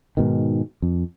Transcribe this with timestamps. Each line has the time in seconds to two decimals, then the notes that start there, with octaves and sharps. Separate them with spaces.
0.17 G#2 B2 D#3
0.82 F2